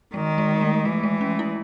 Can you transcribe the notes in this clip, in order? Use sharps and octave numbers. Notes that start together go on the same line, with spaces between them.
D#3 G#3
G#3
A3
E3 A3
G#3
C#4
E4